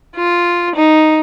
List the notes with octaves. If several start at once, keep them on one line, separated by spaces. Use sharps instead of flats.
F4
D#4